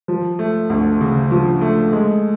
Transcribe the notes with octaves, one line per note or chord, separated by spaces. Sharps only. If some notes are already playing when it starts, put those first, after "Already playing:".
F3
A3
D2
C#3
F3
A3
G#3